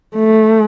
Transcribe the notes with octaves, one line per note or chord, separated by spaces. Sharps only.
A3